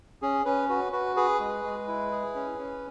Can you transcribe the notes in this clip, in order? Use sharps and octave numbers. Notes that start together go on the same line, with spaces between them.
C#4 G#4
C#4 B4
F#4 B4
F#4 B4
G#4 B4
G#3
G#3
E4
G#4
C#4
C#4